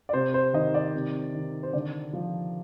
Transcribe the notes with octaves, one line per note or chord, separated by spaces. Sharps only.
D5
C3 C5
C5
D#3 D#5
D5
C3
D#3
C5
D3 D5
F3